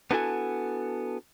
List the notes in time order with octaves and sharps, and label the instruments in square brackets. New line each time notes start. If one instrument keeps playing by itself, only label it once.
[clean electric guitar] B3 D4 E4 F#4 A4 G#5